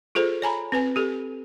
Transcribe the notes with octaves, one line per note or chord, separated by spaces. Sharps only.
F4 G#4 A4 C5
C#5 G#5 A#5 B5
C4 B4 G#5
G4 A4